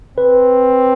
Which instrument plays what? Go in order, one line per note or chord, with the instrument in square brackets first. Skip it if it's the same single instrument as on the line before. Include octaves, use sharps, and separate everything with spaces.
[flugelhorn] C4 [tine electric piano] B4